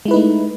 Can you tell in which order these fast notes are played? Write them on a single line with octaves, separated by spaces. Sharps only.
G#3 E4 B4 D#4 A3